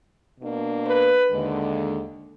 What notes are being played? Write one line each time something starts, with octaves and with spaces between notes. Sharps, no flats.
B2 A#3 D4
B4
D#2 D3 G#3